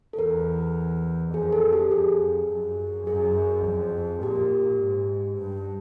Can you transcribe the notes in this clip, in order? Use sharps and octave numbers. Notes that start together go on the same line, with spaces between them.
A4
E2 A#4
F2 G#4
A4
G4
F2 G#4
F#2
F#2 G#4
F2
A#2 G4
G#2
G2